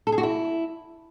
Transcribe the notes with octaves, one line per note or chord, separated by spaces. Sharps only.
A4
G#4
F#4
E4